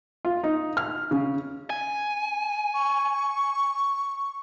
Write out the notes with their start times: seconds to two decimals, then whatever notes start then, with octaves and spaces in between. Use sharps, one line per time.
0.25 F4
0.44 D#4
0.77 F6
1.11 C#3
1.70 G#5
2.74 C#6